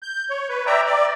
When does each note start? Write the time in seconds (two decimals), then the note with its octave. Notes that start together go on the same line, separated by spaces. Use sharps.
0.02 G6
0.30 C#5
0.49 B4
0.66 D5 E5 G5 A#5
0.86 D5